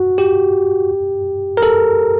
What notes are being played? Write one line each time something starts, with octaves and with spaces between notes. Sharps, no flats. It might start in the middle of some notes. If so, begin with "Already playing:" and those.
Already playing: F#4
G4
A#4
A4